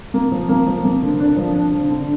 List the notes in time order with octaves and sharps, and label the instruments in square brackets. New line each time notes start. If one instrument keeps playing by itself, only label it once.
[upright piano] A#3
F3
A#3
F3
A#3
D3
D4
F3
D4
D3
D3